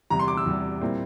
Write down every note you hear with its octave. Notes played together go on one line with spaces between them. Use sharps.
E2 C3 G3 A#5
C6
D6
E6
E2 C3 G3
A#2 G3 C4 E4